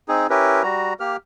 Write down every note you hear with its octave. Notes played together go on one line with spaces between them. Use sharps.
C4 D#4 G#4
C#4 E4 G4 A#4 B4
G3 F#4 A#5
A#3 G4 F6